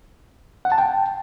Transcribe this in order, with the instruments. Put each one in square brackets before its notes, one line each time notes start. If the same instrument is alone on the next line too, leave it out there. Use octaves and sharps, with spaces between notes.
[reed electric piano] F#5
A5
G5